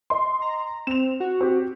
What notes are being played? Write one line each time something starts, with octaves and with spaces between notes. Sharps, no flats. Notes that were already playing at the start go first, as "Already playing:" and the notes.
D#5 C6
A#5
C4 E7 F7
F#4
C4 G4